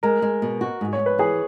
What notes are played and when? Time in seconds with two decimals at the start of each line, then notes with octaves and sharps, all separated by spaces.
0.03 G#3 A#4
0.22 G#3
0.42 B2
0.61 F#4
0.81 G#2
0.93 C#5
0.99 G#2
1.06 B4
1.18 E3 G#4